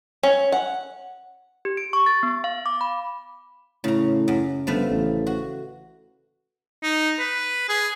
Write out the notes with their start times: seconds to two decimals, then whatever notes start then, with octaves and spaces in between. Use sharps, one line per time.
0.23 C#4
0.52 F#5
1.65 G4
1.77 D7
1.93 C#6
2.06 A6
2.23 B3
2.44 F5
2.66 D6
2.81 B5
3.84 A2 C#3 A#5
4.28 F#2
4.67 G1 F3 A3 B4
4.90 A1
5.27 F#4
6.83 D#4
7.19 B4
7.69 G#4